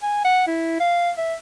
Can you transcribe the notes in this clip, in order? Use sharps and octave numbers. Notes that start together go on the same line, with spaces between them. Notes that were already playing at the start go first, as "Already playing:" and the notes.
G#5
F#5
E4
F5
E5